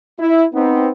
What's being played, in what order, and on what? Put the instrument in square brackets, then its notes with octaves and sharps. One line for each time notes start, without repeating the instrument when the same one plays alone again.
[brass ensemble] E4
B3 C4 D#4